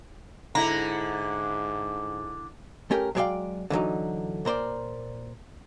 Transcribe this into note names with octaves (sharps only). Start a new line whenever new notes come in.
G#2 D3 E4 A#5
A3 C#4 G4 A#4
F#3 G#3 C#5 D5 F5 G5
D3 E3 F#3 D#4
A#2 A#4 C5 D5